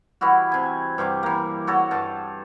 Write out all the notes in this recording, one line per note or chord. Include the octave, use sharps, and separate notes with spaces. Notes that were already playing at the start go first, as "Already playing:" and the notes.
E3 G3 E4 F#4
C3 G#5
G2 C3 G3 D6
E3 A#3
F#4 A4 C#5
G2 A5